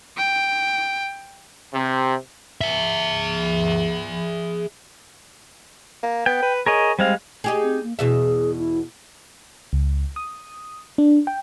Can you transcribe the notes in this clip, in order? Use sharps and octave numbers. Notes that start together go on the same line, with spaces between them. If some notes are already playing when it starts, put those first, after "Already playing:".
G5
C3
G#4 E5
A#3
B3 G5
B4
G#4 A#4 C#5 D#5
G3 G#3 C4 F5
D#4 G4 G#4
C4
A#3
E2 B2 G#4 E5
E4
C#2
D#6
D4
G5